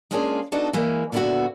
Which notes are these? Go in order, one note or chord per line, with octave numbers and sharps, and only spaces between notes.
G#3 A#3 C#4 D4 F4 G#4
B3 D4 D#4 F#4 A4
E3 G#3 A#3 E4
A#2 D3 B3 D#4 E4 F#4